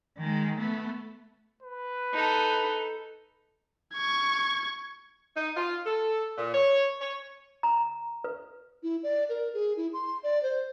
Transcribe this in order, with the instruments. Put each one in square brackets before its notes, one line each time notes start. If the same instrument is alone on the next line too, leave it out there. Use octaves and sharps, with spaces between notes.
[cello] D#3 G#3
A3 B3
[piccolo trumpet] B4
[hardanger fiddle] D#4 A4
[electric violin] C#6 G#6
[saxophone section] D#4
F4
A4
A#2
C#5
C#5
[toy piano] A#5
B4
[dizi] E4
D5
A#4
G#4
E4
C6
D5
C5